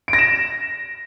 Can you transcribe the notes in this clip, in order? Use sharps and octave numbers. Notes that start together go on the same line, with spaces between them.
D7
A#6
E7